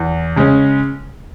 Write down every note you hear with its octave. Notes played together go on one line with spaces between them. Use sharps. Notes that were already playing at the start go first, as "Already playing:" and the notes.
Already playing: E2
C#3 G#3 C#4